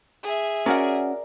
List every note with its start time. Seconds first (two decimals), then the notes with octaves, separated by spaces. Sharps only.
0.23 G#4 E5
0.66 C#4 F#4 A#4 D5 F#5